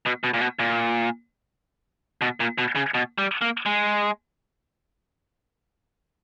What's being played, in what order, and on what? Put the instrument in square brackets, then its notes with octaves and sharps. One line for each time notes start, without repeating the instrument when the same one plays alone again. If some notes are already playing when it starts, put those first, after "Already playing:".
[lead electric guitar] B2
B2
A#2
B2
A#2
B2
A#2
B2
C#3
B2
G3
A#3
G#3